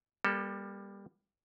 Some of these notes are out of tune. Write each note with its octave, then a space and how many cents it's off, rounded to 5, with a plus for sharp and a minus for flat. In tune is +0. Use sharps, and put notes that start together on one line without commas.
G3 +15 A#3 +45 A4 +10